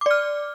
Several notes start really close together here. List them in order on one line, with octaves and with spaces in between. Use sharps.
D6 D5 F6